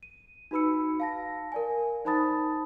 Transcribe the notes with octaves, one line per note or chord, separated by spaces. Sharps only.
D#7
D#4 F#4 B4 B5 E6 C#7
F5 A5 A#6
A#4 D5 G#5
D#4 C5 A5 B5 D#6 A6